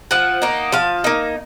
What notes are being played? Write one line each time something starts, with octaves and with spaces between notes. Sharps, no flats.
F3 F#5
A#3 D#4
F3 F5
A#3 D#4